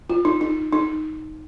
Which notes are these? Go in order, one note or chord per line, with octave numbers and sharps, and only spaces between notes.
F4
D#4
D#4
D#4